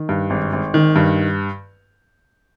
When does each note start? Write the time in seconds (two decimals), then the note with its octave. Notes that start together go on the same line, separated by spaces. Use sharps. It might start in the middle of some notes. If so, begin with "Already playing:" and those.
Already playing: D#3
0.09 G2
0.30 G#1
0.53 G#1
0.74 D#3
0.96 G2